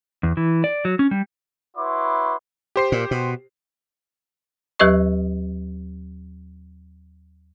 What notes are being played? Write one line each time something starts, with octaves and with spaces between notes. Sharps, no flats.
E2
E3
D5
F#3
C#4
G3
E4 F#4 B4 C#5 C6 D6
G4 C5 C7
A#2
B2
D#2 F#3 G4 B4 D#5 C#6